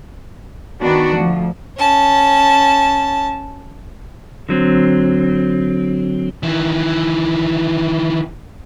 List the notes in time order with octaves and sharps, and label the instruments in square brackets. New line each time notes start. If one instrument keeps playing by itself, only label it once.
[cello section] D#3 B3 D4 F#4
D2 F3
[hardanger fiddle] C#4 A5
[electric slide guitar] D3 F#3 C4
[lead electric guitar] D#3 E3